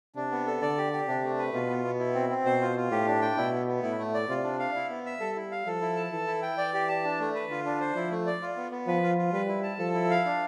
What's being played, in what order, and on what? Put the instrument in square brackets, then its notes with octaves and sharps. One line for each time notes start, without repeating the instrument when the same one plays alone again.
[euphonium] C3 [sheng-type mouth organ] D4
[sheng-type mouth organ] B3
A4
[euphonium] D3 [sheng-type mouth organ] D5
[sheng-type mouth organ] G4
G4
[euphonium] C3 [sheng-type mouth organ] D4
[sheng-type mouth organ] A3
B4
[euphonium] B2 [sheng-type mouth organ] F4
[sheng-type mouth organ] B3
B3
E4
C4
C4
[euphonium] B2 [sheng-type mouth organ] C5
[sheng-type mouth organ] F4
F4
[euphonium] A2 [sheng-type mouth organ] G4
[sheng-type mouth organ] D4
G5
[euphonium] B2 [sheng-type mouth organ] E4
[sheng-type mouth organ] B3
B3
[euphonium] A2 [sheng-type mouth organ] E4
[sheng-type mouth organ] A3
D5
[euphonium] C3 [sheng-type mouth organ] F4
[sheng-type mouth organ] D4
F5
E4
B3
E5
[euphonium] G3 [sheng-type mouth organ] A4
[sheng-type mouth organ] E4
F5
[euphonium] F3 [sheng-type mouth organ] A4
[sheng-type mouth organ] E4
A5
[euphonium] E3 [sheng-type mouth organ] A4
[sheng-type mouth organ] E4
G5
[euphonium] E3 [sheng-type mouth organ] D5
[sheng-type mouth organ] G4
A5
D4
A3
B4
[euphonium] D3 [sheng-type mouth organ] F4
[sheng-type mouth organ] D4
C5
[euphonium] F3 [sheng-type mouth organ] E4
[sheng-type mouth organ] A3
D5
F4
B3
B3
[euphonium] F3 [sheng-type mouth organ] B4
[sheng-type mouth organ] F4
F4
[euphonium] G3 [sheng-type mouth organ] B4
[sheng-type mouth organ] E4
A5
[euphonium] F3 [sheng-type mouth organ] A4
[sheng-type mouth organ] E4
F5
D4